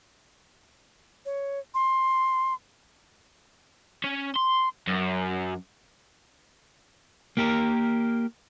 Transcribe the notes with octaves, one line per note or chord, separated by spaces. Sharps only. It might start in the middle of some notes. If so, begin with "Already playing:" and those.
C#5
C6
C#4
C6
F#2
A#3 G4 A#4